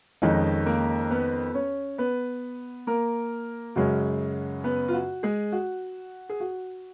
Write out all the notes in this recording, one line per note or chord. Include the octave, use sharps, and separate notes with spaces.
F2 D#3 G#3 C#4 D#4 D#5
A#3 A#4
B3 B4
C#4 C#5
B3 B4
A#3 A#4
F#2 C#3 G#3 C#4 F#4
B3 B4
F4
F#4
G#3 G#4
F#4
G#4
F#4